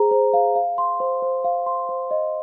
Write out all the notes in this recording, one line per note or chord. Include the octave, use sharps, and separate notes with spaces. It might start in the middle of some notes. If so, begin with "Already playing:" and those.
Already playing: G#4 C5 A#5
C5
F5
F5
C6
C5
C5
F5
C6
C5
D#5